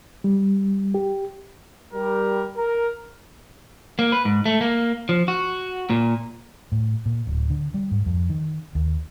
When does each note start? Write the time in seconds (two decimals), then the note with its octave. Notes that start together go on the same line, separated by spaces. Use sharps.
0.24 G3
0.94 G4
1.93 G3 A#4
2.56 A#4
3.99 A#3
4.12 B4
4.25 G#2
4.46 A3
4.61 A#3
5.09 F3
5.28 F#4
5.90 A#2
6.72 A2
7.06 A#2
7.27 D1
7.50 D3
7.74 G3
7.91 G#2
8.06 F2
8.30 D#3
8.75 D#2